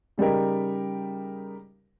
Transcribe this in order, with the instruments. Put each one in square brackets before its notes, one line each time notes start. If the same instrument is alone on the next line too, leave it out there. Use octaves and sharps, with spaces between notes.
[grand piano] C#3 G3 D#4 G4 A#4